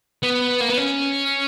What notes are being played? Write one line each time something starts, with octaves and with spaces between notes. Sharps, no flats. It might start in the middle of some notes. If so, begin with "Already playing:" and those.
B3
A#3
B3
C#4